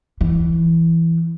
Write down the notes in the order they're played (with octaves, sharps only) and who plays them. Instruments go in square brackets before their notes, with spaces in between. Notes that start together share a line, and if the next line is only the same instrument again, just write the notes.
[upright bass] E3